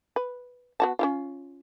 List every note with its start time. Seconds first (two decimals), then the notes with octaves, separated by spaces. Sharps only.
0.16 B4
0.80 B3 F#4 A5
0.99 C#4 E4 F4